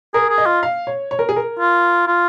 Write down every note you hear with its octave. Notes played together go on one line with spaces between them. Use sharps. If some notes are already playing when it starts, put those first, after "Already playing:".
G#4 A#4
G#4
D#5
F4
F5
C#5
C#5
A#4
G#4
A#4
F4
F4